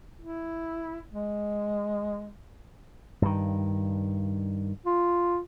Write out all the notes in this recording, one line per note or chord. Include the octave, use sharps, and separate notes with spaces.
E4
G#3
G2 D#3
F4